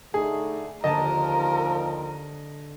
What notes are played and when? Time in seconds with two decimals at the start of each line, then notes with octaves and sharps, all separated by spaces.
0.14 D3 A3 D#4 G#4
0.84 D#2 D3 F3 A#4 D#5 A5